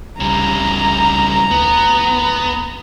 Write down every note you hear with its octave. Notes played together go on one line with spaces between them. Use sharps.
C2 C#3 G3 A#5
D2 B3